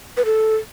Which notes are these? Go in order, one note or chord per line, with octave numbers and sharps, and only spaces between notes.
B4
A4